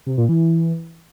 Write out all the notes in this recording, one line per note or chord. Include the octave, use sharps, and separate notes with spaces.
C3
A#2
E3